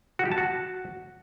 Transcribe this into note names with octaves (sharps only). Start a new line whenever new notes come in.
F#4
G4
A5
F#4